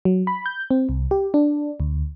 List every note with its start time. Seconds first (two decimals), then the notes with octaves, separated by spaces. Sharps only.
0.05 F#3
0.27 B5
0.46 G6
0.71 C4
0.89 C2
1.11 G4
1.34 D4
1.80 D2